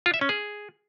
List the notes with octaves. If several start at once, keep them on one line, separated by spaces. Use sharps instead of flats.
F4
E5
C#4
G#4